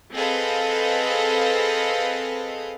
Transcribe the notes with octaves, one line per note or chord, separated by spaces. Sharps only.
C4 G#4 A4 B4 D#5 F5